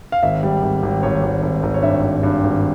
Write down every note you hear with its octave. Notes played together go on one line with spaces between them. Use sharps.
F5
G#1 E5
G3
G#1
G#1
G#1 C#5
G#1
G#1
G#1
C#5
G2 E5
G#1
G2
G#1